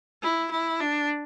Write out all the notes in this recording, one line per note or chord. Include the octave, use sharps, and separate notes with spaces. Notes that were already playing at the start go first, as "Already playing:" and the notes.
E4
E4
D4